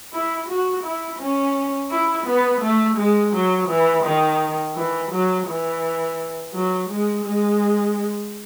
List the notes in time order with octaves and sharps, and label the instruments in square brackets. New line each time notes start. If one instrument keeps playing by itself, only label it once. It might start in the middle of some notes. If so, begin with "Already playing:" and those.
[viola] E4
F#4
E4
C#4
E4
B3
A3
G#3
F#3
E3
D#3
E3
F#3
E3
F#3
G#3
G#3